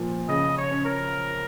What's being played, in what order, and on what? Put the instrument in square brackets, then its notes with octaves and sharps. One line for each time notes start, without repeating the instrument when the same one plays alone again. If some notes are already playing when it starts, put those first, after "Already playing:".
Already playing: [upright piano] A#2 F3
[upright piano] C#3 [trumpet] D#5
[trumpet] C#5
[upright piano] C#4
[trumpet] A#4